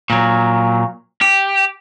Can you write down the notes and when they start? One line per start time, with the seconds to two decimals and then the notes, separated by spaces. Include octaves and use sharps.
0.10 A#2 F#3
1.21 G4